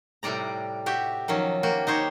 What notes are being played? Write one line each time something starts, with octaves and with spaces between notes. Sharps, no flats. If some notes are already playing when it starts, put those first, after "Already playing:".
A2 C3 G3 D5 A#5
F#4 G4 E5
D#3 F3 F#3 C#4
A#3 F#4 G4
D#4 G4 C5 C#5